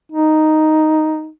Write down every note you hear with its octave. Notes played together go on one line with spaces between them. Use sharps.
D#4